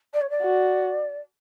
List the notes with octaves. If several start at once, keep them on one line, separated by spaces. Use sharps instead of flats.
D5
C#5
D5
F#4